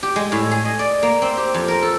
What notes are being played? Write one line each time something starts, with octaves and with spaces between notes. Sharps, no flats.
G4
G#3
A2
G#4
D#5
D5
A#3
C4
G4
F2
A#4
A4